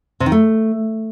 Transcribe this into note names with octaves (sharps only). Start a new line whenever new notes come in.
C3
D#3
A3